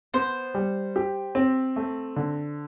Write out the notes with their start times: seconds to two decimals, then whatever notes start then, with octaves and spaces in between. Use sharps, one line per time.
0.14 B3 C5
0.54 G3
0.96 G4
1.35 C4
1.76 A3
2.16 D3